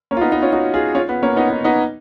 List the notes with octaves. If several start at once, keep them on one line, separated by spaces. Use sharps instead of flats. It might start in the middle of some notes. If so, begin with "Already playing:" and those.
A#3 C#4
F4
B3 D#4
B3 D#4
C#4 F4
D#4 F#4
F4 G#4
C#4 F4
B3
A#3 C#4
B3 D#4
B3 D#4
B3 D#4